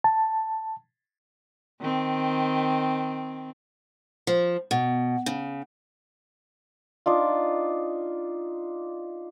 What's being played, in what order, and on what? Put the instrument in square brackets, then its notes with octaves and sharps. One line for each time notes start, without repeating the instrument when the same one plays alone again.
[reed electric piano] A5
[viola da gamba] D#3 C4
[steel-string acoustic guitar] F3
B2
C#3
[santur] D4 D#4 F4